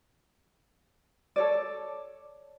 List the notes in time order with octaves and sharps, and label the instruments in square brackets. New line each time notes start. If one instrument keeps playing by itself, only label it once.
[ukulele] A4 C#5 D5